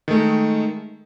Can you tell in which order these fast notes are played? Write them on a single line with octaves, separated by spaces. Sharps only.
D#3 A3 G#3